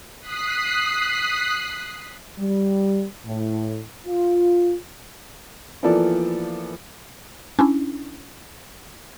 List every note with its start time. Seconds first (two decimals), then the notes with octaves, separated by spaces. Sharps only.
0.19 D#6 F#6 B6 C7
2.38 G3
3.26 A2
4.07 F4
5.83 E3 F3 A#3 B3 A4 D5
7.59 C#4 D4 E4